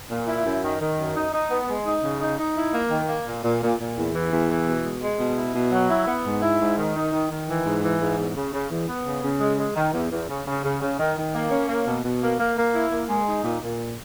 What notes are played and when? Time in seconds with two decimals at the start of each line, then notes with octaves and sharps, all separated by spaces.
0.10 A#2
0.28 E4
0.45 F#2
0.63 D#3
0.81 D#3
0.98 F#2
1.15 D#4
1.33 D#4
1.50 B3
1.69 G#3
1.86 D#4
2.03 C#3
2.20 D#4
2.39 D#4
2.56 E4
2.73 A#3
2.91 D#3
3.08 A#3
3.27 A#2
3.44 A#2
3.62 A#2
3.79 A#2
3.97 E2
4.14 E3
4.32 E2
4.49 E3
4.67 B2
4.84 G#3
5.01 G#3
5.19 B2
5.36 E4
5.55 B2
5.72 F#3
5.90 E4
6.07 B3
6.25 G#2
6.42 E4
6.60 G#2
6.77 D#3
6.95 D#4
7.13 D#3
7.30 D#3
7.47 E3
7.65 G#2
7.83 E3
8.00 G#2
8.18 E2
8.36 C#3
8.53 C#3
8.70 E2
8.87 B3
9.06 C#3
9.23 C#3
9.40 G#3
9.58 G#3
9.75 D#3
9.93 E2
10.11 E2
10.29 C#3
10.47 C#3
10.64 C#3
10.81 C#3
10.99 D#3
11.17 D#3
11.34 A#3
11.51 C#4
11.69 A#3
11.86 B2
12.04 B2
12.22 A#3
12.39 A#3
12.57 A#3
12.74 E4
12.91 A#3
13.09 G#3
13.28 D#4
13.44 A#2
13.62 A#2